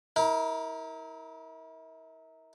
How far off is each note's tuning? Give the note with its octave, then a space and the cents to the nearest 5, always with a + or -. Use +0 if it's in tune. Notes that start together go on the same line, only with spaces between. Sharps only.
E4 -40 A#4 +0